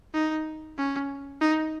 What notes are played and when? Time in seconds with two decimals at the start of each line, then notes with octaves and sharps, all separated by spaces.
0.14 D#4
0.78 C#4
1.41 D#4